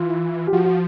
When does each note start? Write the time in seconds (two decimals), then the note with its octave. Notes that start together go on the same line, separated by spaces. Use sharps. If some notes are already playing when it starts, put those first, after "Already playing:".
Already playing: E3 F4
0.47 G4
0.53 F3 F#4
0.65 F#4